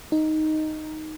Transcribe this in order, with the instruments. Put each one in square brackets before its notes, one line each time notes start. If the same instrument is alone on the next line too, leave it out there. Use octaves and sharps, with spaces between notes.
[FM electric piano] D#4